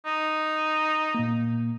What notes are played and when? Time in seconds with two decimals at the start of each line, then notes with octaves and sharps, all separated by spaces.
0.06 D#4
1.15 A#2 A#3